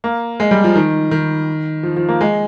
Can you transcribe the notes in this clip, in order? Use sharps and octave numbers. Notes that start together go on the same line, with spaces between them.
A#3
G#3
G3
F3
D#3
D#3
F3
F3
A#3
G#3